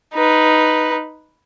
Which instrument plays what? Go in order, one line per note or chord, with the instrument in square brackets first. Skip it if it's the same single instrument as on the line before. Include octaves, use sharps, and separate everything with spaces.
[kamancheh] D#4 B4